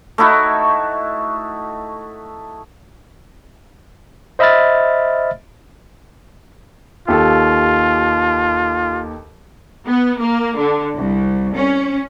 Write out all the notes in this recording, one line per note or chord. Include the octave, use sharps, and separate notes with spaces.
A3 D#4 E4 F#4
C5 D#5 E5 B5 F6 A6
D#2 F4 G4 A4
B3
A#3
D3
C2
C#4